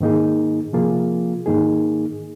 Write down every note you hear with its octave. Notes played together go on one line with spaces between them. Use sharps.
G#2 D#3 A#3 D#4 G#4
C3 F3 A#3 F4 G#4
G#2 D#3 A#3 D#4 G#4